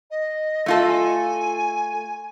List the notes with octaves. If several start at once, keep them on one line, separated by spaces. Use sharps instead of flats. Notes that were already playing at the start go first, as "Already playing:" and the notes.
D#5
A3 F4 A4
G#5